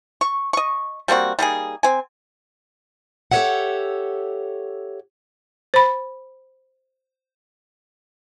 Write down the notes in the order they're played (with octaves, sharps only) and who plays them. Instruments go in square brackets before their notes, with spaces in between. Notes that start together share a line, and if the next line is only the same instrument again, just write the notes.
[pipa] C#6
D#5 C#6
G3 A#3 C4 F#4
G3 A#3 D#4 G#4
C4 G#5
[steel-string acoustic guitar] G4 A4 B4 C#5 E5 F#5
[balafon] C5 B5